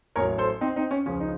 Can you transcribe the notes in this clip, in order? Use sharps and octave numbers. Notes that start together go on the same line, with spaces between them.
A1 A2 F#3 A#4 C#5
A4 C5
C4 D#4
C4 D#4
C#4
C#2 C#3 F3 C#4
D#4